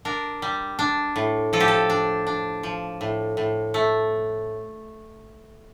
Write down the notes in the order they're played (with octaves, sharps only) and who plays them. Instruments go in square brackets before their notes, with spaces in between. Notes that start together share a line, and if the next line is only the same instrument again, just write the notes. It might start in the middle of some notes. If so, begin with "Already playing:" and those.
[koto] D4 A#4
G3
D4
A2
F3 A4
G4
A4
D4
D4
F3
A2
A2
A3